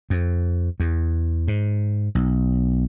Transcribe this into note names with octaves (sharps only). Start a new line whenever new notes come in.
F2
E2
G#2
B1